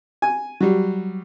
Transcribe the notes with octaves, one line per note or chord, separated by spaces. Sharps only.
G#5
F#3 G3